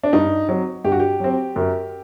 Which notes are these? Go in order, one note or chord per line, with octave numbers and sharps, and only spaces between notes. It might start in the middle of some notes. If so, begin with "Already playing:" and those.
D4
G2 D#4
F#3 C4
G2 G4
F#4
G4
F#3 C4
F#2